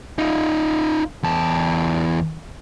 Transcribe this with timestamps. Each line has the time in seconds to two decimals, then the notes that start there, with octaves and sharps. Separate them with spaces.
0.18 D#4 F4
1.23 E2 A5